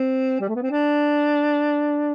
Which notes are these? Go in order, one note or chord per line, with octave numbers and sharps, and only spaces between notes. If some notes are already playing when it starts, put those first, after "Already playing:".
Already playing: C4
G3
A3
B3
C4
D4